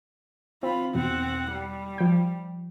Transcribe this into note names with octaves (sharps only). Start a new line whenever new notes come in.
C4 F4 B5
E2 B2 C4 F#5
G3
F3 G5